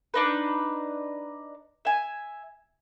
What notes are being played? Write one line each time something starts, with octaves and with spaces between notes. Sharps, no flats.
D4 D#4 B4
E5 G#5